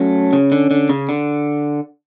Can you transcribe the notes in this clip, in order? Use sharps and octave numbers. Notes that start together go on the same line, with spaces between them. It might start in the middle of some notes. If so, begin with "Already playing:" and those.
Already playing: F#3 A3 C#4
C#3
D3
D3
C#3
D3